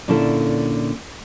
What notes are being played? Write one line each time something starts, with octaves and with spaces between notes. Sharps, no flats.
A#2 D3 C#4 E4 A4 D5